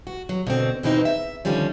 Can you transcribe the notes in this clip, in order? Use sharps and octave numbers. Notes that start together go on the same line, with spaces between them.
F#4
F#3
B2 D3 C4
B2 E3 G#3 C4 C#4 D#4
E5
D3 D#3 F3 G3 C#4